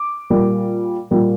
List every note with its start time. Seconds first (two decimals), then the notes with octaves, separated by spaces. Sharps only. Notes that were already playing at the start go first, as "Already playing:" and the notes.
Already playing: D6
0.30 A#2 G3 A#3
1.11 A#2 G3 A#3